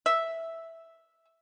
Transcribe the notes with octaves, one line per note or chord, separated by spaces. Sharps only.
E5